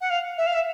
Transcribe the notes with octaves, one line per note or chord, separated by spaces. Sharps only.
F#5
F5
E5
F5
E5